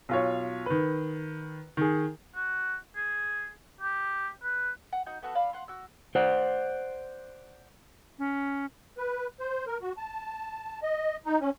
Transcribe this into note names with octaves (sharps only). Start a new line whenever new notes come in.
B1 F4 C#5
D#3 B4
D#3 G#4
F#4
G#4
G4
B4
F#5
D#4 F#4 G6
A3 B3 F#4 A4
D5 F5 B5 E6
F5 F#5 C6
F#4 E6
C5 D5 F#5
C#4
B4
C5
A#4
F#4
A5
D#5
D#4
C#4